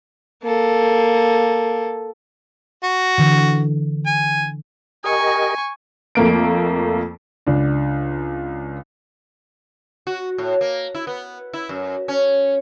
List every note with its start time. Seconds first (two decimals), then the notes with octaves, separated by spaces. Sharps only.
0.43 A#3 A4
2.83 F#4
3.18 D3 E3
4.06 G#5
5.04 G4 A#4 D#5 G#5 C#6
6.15 F2 A3 A#3 D7
7.47 C#2 D4
10.07 F#4
10.38 A2
10.61 A#3
10.95 E4
11.07 B3
11.53 E4
11.69 F#2
12.08 C#4